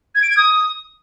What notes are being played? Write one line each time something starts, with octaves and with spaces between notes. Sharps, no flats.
G#6
D7
G#6
D#6